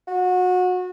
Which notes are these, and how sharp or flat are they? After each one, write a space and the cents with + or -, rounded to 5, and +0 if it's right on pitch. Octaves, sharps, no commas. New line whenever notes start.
F#4 -25